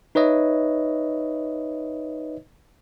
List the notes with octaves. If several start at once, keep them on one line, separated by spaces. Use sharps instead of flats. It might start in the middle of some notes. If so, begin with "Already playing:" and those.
D#4 B4 C#5 D#5 E5